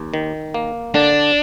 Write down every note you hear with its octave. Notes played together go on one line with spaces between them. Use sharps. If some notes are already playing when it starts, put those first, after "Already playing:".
Already playing: D#2
D#3
A#3
D3 D4